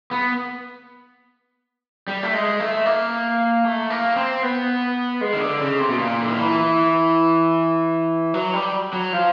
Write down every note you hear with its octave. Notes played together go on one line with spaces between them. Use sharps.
B3
G3
A3
G#3
A3
A#3
A3
A#3
C4
B3
G#3
D#3
D3
C#3
C3
B2
A#2
D3
D#3
E3
F#3
G3
F#3
F3